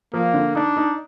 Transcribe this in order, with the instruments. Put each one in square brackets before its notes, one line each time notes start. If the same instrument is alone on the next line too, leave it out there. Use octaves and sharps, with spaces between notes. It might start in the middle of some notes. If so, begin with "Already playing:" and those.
[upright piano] F3 [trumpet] A#3
[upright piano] D3
[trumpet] D4 [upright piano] D#4
[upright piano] D#4